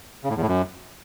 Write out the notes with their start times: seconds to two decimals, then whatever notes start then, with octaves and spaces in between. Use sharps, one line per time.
0.24 C#3
0.30 A2
0.36 E2
0.42 A2
0.48 F#2